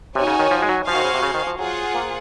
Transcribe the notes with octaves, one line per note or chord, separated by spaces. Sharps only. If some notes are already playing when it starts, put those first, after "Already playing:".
C3 D#4 F#4 C#5 G#5
C#3
D#3
F3
G#3
F#3
F3 F#4 C5 F5 G#5
D#3
C#3
C3
C#3
D#3
F3
F#3 F4 G#4 C5 F#5
A#3